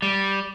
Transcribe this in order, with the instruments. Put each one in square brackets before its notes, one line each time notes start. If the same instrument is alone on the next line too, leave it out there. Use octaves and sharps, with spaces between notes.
[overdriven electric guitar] G3